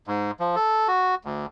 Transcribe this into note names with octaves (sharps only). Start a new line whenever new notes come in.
G#2
F3
A4
F#4
D2